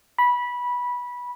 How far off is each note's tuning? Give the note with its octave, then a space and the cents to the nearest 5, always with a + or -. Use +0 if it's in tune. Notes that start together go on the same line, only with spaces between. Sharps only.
B5 -15